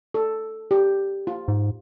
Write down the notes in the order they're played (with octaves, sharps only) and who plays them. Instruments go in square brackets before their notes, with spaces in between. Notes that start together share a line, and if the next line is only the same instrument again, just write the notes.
[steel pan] A4
G4
F4
[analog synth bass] G#2